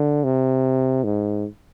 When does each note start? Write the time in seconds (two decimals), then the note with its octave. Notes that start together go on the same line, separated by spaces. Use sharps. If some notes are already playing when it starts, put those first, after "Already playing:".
Already playing: D3
0.24 C3
1.04 G#2